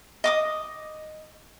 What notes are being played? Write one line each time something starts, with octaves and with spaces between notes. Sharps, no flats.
D#5 D6 D#6